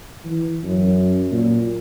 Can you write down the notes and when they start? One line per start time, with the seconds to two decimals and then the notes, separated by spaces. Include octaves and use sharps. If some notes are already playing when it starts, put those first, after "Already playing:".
0.24 E3
0.63 F#2
1.32 A#2